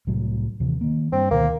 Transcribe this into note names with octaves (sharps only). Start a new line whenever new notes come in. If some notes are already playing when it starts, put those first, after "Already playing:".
C2 A2 F#3
D#2 C3 E3
D#3 A#3
G2 C4
D2 B2 D#3 A#3